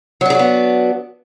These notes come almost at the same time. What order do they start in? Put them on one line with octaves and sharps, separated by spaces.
F#3 D4 G#4 F#4 B3